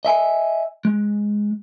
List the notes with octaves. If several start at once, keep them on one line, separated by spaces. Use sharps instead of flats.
D#5 E5 G#5
G#3